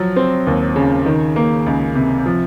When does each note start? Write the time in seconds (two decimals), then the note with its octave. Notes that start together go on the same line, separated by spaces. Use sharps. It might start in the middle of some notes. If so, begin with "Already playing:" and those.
Already playing: F3 F#3
0.16 C4
0.47 D#2
0.76 C#3
1.06 D#3
1.36 A#3
1.66 C#2
1.95 C3
2.26 F3